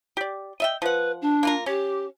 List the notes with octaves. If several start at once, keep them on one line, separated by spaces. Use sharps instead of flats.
G4 D5
D#5 E5 G5
F3 B4 F#5
D4
A#3 F4 A#4
C#4 G4